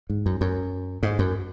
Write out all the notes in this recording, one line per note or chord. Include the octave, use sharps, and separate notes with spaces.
G#2
F#2
F#2
G#2
F#2